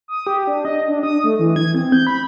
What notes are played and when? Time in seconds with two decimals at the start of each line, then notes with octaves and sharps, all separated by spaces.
0.08 D#6
0.27 G4
0.47 D4
0.65 D#5
0.88 D4
1.03 D#6
1.24 A3
1.39 E3
1.56 G#6
1.75 C4
1.92 G6
2.07 B5